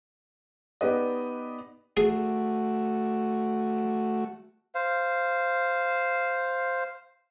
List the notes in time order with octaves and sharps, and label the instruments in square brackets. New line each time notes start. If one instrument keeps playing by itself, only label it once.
[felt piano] B3 D#4 G4 B4 D5 D#5
[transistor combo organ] A3 F#4 [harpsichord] G#4
[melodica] C5 F5